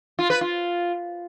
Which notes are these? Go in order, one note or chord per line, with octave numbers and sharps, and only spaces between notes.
F4
B4
F4